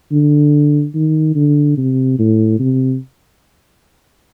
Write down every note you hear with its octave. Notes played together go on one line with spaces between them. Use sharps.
D3
D#3
D3
C3
A2
C3